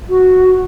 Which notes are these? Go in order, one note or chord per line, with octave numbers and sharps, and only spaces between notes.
F#4